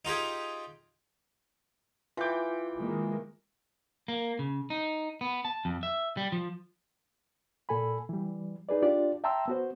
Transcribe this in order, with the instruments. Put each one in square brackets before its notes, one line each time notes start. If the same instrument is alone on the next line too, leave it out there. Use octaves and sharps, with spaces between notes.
[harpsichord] D#4 F4 G4 G#4
[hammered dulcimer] E3 G5 [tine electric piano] F4 D6
[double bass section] D#3 G#3 A#3
[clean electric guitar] A#3
C#3
D#4
B3
A5
F2
E5
G3
F3
[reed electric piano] A#2 A4 G#5 B5
E3 G3
D#4 G#4 B4 D5
D4 F4 G4 D5
E5 G5 A5 A#5 C6 E6
B3 F#4 C5